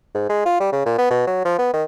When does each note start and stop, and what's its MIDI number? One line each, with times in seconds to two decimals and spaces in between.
0.15 0.25 44
0.29 0.42 56
0.45 0.56 65
0.60 0.69 55
0.72 0.81 49
0.86 0.97 46
0.98 1.08 59
1.10 1.26 47
1.27 1.41 54
1.45 1.54 53
1.58 1.72 59
1.73 1.84 51